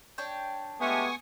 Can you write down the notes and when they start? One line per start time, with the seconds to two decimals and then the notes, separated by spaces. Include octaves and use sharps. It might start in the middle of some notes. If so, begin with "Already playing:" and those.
0.18 D4 C#5 G5
0.81 G#3 A3 B3 G4 G#5 C#6 D#6